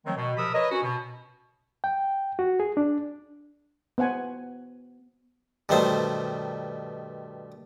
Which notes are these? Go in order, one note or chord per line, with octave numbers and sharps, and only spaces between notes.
D#3 F3 F#3 G#3 A3 C4
B2
C3 F3 A#4 B5 D#6 E6
A#4 B4 C#5 D#5
C#4 F#4
B2
G5
F#4
G#4
D4
B3 C5 F#5 G#5
G2 B2 D#3 A3 C5